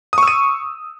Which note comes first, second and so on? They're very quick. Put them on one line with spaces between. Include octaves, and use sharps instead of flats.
D#6 C#6 E6 D#7